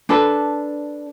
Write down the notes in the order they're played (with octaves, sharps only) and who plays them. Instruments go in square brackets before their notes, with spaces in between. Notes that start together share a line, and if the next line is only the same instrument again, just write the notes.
[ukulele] D4 A4 B4